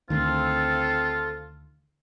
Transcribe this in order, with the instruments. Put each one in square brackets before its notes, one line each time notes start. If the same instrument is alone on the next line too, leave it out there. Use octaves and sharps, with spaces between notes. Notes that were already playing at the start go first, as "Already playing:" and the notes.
[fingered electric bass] D2 D#3 [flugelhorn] C4 [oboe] F4 [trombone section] A4